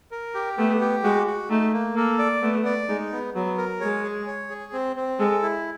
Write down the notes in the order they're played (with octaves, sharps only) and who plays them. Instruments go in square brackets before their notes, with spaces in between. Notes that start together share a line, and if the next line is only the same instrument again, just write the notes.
[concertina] A#4
G4
[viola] A3 [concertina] B3
[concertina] G4
[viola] G#3 [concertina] F#4
[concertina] F#4
[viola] A3 [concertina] D#4
[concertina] A#3
[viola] A#3 [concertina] A4
[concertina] D5
[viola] A3 [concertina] B3
[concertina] D5
[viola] G#3 [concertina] D#4
[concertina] B3
[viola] F#3 [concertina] B3
[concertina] A#4
[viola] G#3 [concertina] C#5
[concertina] G#4
C#5
G#4
C4
C4
[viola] G#3 [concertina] A4
[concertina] E4